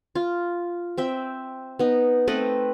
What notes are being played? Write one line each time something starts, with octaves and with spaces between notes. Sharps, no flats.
F4
C4 E5 G5
B3 D#4
A3 C4 B4 D#5